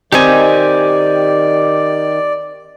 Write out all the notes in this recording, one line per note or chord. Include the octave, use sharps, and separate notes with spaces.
D#3 C4 D#4 G4 D5 G#5